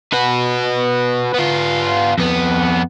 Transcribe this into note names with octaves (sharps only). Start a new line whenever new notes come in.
F#4 B4
B3 F4
F2 B3